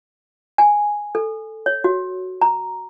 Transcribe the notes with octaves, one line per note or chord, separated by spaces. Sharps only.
G#5
A4
C#5
F#4
A#5